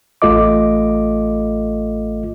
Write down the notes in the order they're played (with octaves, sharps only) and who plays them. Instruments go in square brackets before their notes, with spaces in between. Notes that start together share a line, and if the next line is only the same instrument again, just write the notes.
[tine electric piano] A1 A3 F4 A4 D#5 D6